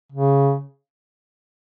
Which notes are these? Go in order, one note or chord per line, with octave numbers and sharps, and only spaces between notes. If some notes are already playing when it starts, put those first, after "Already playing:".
C#3